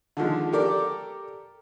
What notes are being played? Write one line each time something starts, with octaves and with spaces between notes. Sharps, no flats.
D3 D#3 F3 G#3
G4 A4 A#4 D5